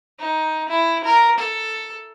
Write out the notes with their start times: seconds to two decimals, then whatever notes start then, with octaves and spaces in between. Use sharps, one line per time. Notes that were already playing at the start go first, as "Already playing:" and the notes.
0.19 D#4
0.68 E4
1.04 A#4
1.38 A4